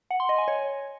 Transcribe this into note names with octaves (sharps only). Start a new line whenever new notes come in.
F#5
C6
D#5
G#5
C#5